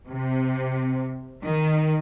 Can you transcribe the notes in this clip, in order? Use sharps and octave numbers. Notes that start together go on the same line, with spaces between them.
C3
D#3